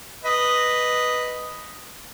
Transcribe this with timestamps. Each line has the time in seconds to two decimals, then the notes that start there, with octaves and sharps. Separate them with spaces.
0.25 B4 D#5